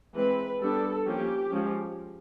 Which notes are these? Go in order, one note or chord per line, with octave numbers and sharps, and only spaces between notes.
E3 G#3 C4 B4
G3 B3 D4 A4
F3 A#3 C#4 G4
F3 G#3 C#4